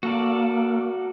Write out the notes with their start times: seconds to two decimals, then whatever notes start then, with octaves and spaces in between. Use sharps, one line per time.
0.03 A#3 F#4 A4 D5